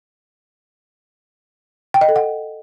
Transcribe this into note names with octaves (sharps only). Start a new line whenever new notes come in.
G5
D#5
A4
F#5